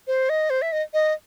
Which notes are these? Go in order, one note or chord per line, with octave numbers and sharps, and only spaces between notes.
C5
D#5
C5
E5
D#5
D#5